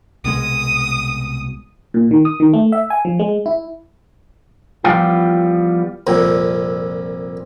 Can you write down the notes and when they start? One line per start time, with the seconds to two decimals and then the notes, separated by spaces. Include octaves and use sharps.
0.24 C2 B2 G#3 D#6
1.94 A#2
2.11 D#3
2.25 D#6
2.40 D#3
2.53 A3
2.72 E5
2.90 G#5
3.05 F3
3.19 G#3
3.46 E4
4.84 E3 F3 G3 B3 F4 G4
6.07 C2 F2 A#2